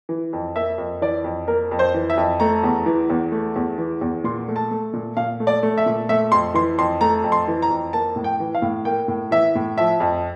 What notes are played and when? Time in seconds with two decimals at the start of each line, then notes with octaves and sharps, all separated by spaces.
0.09 E3
0.33 F2
0.56 A#3 E5
0.78 F2
1.01 E3 D5
1.24 F2
1.48 A#3 A#4
1.71 F2
1.79 C5
1.94 E3
2.10 E5
2.17 F2
2.40 A3 A#5
2.64 E2
2.86 E3
3.10 E2
3.32 A3
3.56 E2
3.78 E3
4.01 E2
4.24 A#2 C6
4.48 A3
4.56 A5
4.71 A3
4.93 A#2
5.17 A#2 F5
5.40 A3
5.47 D5
5.63 A3
5.78 E5
5.86 A#2
6.09 A3 E5
6.32 F2 C6
6.54 E3 C6
6.78 F2 C6
7.01 A3 A#5
7.24 F2
7.32 C6
7.48 E3
7.62 A#5
7.70 F2
7.93 A#3 A5
8.16 A2
8.24 G5
8.40 E3
8.55 F5
8.62 A2
8.85 A#3 G5
9.08 A2
9.31 E3 E5
9.55 A2
9.78 F3 E5
10.00 F2